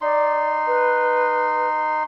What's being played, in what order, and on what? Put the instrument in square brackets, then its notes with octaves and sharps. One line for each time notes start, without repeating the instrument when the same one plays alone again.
[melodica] D#4 C6 [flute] D5
[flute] B4